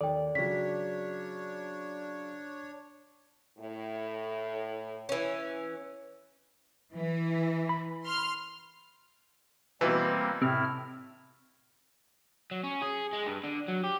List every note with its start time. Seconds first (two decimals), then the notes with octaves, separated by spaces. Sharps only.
0.01 D#2 A4 D5 G5
0.35 C#3 F#3 D4 C#5 B6
3.58 A2
5.09 E3 C#4
6.94 E3
7.69 B5
8.04 C6 F6
9.81 B2 E3 G3 A#3 C4
10.42 A2 C3 E4 F6
12.51 F#3
12.64 C#4
12.82 G#4
13.13 G#3
13.26 G2
13.44 D3
13.68 F#3
13.84 G4